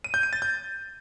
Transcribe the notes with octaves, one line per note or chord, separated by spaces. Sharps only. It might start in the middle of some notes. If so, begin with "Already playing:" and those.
D#7
G6
D#7
A6
G6